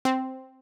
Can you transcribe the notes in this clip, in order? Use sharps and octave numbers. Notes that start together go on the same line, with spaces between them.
C4